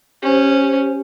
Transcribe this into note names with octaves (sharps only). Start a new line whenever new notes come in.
C#4 G4 C5